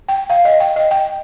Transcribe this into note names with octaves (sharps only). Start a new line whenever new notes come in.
G5
F5
D#5
G5
D#5
G5